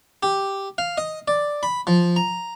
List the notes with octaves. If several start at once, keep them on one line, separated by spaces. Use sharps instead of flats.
G4
F5
D#5
D5
B5
F3
A#5